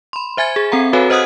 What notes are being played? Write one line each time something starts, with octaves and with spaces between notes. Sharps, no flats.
B5 C6
C5 E5 G#5 G#6 A6
G#4
C4 A4 F#5 A#5
F#4 A4 B4 C#5 F5 G#5
C5 D#5 F#5 D#6 F6 F#6